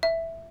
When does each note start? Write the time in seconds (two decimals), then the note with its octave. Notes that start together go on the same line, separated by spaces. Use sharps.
0.03 E5